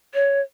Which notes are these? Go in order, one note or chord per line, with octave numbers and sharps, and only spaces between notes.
C#5